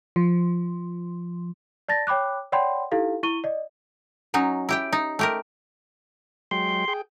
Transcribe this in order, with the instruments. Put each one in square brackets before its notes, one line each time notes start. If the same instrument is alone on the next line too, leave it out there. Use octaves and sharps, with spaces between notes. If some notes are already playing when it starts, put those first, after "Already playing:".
[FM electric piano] F3
[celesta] D5 A5 A6 A#6
C#5 G5 B5 D6 F#6
C#5 D5 F#5 G5 B5 C6
D#4 E4 G4 A4 F5
E4 C#6 D#7 G7
D5 D#5
[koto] F#3 C#4 D#4
E4 G4 G5
D#4
A3 G4 A#4
[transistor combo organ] F#3 G#3 G5 [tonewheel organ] C6
[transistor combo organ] G#4 G5